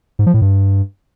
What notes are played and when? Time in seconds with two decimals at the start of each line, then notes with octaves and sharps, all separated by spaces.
0.19 G#2
0.26 F3
0.34 A2
0.42 G2